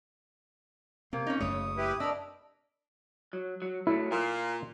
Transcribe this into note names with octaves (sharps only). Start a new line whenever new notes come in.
C3 A#3 C4
C#3 C#4 D#4
F#1 F#2 A3 C#5 D#6
E4 G4 B4
D4 A#4 D#5 B5 E6
F#3
F#3
F#3 A3 E4
A#2 A#3